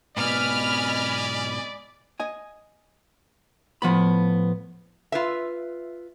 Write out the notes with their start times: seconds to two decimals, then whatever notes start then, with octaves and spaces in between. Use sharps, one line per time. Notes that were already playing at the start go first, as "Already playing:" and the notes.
0.17 G#2 B2 B3 D5 D#5 G#5 B5 F6
2.20 D#5 G#5
3.82 A2 F3 B3 B5
5.12 F4 B4 E5